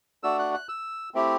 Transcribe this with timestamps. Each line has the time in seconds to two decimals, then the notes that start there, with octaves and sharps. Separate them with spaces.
0.23 A3 D4 F#4 E6
0.39 F#6
0.54 F#6
0.69 E6
1.14 A3 C4 E4 G4